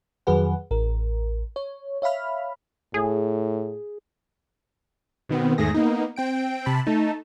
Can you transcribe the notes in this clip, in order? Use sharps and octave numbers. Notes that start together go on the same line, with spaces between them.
F2 D#3 F#3 G#4 B4 F#5
A1 A#4
C#5
C#5 E5 F5 B5 F6
A2 G#4
B2 D#3 B3 C4
E2 G#2 D#3 A3 G#4 A#6
A#3 B3 D#4
C4 G5 D7
C3 A5 B5
A3 D#4 A5